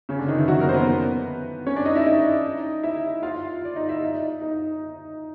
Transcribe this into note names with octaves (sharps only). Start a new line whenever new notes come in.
C#3 C#4
D3 D4
D#3 D#4
E3 E4
F#3 F#4
A#3 A#4
C5
B3 B4
B3 B4
C#4 C#5
D4 D5
D#4 D#5
E4 E5
D#4 D#5
E4 E5
F4 F5
D5
D#4 D#5
E4 E5
D#4 D#5
D#4 D#5